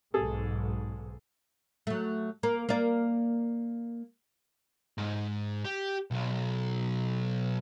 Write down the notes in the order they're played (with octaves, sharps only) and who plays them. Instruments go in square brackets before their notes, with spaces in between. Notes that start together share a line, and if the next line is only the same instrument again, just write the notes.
[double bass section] B1 G#2 [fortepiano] G#4 A4
[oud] F#3 A3
A#3
A#3 D5
[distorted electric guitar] G#2
G4
B1